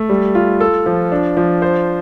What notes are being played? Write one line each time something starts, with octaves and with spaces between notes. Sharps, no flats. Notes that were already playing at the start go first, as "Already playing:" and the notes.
Already playing: A3
G3
F4
A4
F3
D4
F3
C5